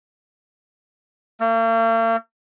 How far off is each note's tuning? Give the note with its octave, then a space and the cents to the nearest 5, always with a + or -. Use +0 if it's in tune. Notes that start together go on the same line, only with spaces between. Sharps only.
A#3 -45